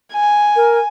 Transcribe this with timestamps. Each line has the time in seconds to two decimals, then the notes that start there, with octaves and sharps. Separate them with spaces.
0.13 G#5
0.56 A#4